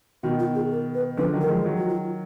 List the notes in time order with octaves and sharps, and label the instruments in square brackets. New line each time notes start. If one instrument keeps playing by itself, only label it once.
[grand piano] B2 D#3 [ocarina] F#4
[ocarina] F4
G#4
A#4
B4
[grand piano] D3 F3 [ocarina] B4
[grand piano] D#3 F#3
[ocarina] A#4
[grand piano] F3 G#3
D#3 F#3
[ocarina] F#4
F4